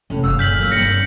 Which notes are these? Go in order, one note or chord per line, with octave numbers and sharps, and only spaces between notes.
F2 A2 C3 C#4
F#1 F5 F#5 E6
A#2 C#3 F6 G6 B6 F#7
F#3 A#3
G2 C4 A#6 C#7 F#7